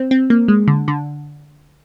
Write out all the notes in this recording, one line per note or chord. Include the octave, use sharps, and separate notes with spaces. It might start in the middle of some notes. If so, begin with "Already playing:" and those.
Already playing: C4
C4
A#3
G#3
D3
D3